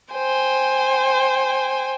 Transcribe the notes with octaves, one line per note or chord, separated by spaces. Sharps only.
C5 G5 G#5